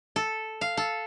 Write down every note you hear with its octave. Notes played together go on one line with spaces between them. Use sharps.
A4
F5
A4